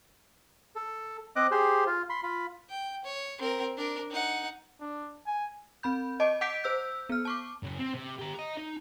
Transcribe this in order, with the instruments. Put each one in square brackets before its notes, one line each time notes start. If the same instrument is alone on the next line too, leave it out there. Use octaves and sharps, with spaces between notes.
[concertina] A4
C4 D#5 D6 F#6
G4 G#4 C5
F4
B5 C6
F4 B5
[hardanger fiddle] G5
C#5
C4 A#4
D4 A#4
D#4 F#5
[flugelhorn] D4
G#5
[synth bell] C4 B5 G6
D#5 A5 D6
F#5 D6 G6 B6 D7
C5 E6 G6
B3 F6
A5 C#6 D6
[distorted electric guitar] F#2 C#3
C4
C3
G4 A#5
D#5 A#5
D#4